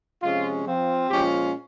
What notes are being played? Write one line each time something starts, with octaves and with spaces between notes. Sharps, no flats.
C3 F3 G#3 C#4 F4
F3 C4 F4
A#2 F3 G#3 C#4 F4 G4